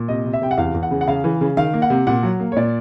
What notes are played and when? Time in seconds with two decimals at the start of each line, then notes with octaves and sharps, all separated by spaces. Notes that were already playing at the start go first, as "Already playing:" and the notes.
Already playing: A#2
0.08 C3 D#5
0.25 C3
0.33 E5
0.42 C3 G5
0.51 F#5
0.58 E2 F5
0.74 E2
0.83 F#5
0.91 C#3
1.01 F#5
1.08 C#3 F5
1.24 E3
1.41 C#3
1.57 D#3 F5
1.74 A#3
1.82 F#5
1.90 C3
2.07 A#2 F#5
2.23 F#3
2.40 A#3
2.52 C#5
2.56 A#2 D5